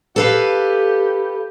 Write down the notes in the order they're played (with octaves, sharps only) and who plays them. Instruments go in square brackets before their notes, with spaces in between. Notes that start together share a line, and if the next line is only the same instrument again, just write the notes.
[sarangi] G4 [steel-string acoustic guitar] A4 B4 F5